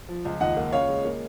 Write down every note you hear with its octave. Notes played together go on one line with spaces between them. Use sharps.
F3
C#2
D#2 D#5 F#5
A#3
C#3 C#5 F5
G#3
A#3